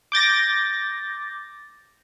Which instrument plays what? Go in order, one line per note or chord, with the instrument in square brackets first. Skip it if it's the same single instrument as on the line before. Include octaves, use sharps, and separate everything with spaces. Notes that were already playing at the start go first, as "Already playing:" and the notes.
[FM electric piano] D6 G6 A6 A#6